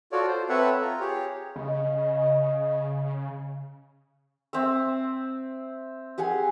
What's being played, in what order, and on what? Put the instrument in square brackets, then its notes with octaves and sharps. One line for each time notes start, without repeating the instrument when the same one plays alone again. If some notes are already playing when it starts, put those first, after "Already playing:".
[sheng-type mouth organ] F4 F#4 A4 C#5 D5
C5
C4 A4 B4 C#5 E5 F#5
F4 A#5
G4 G#4 C#5
[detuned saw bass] C#3 [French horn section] D#5
[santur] C4 E5 E6
G4 G#4 F#5 G#5